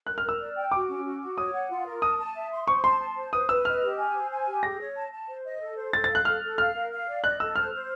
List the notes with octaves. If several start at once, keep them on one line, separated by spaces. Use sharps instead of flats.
A#4 F#6
F6
A#4
E6
D5
G5
F#4 D6
C#4
F#4
F#4
C#5 D#6
F#5
F4
A#4
A5 D#6
A5
E5
C6
C5 C#6
A5 C6
A5
C5
B4 D#6
B4 E6
D#5 F6
G4
G#5
C5
G#5
G4
G#4 A#6
C#5
A5
A5
C5
D#5
A4
C5
A4 A6
A6
F5
F#6
A4 F6
A4
F5 F6
A#4
F5
D5
D#5 F#6
A4 E6
C5 F6
C5